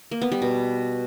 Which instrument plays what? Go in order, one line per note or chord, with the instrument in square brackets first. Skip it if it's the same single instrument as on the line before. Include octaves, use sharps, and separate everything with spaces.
[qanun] A#3
B3
G3
B2